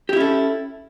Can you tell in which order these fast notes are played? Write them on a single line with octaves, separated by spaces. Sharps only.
G4 E4 C#4 A4